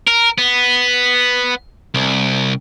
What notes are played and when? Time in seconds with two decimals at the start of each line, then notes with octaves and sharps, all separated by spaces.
0.08 A#4
0.38 B3
1.94 C2